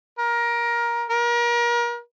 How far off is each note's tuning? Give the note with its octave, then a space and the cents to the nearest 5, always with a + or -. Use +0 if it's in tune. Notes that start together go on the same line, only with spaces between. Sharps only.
A#4 +20
A#4 +35